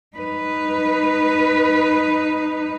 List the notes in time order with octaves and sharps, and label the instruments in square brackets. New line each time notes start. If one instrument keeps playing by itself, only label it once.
[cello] D#4 B4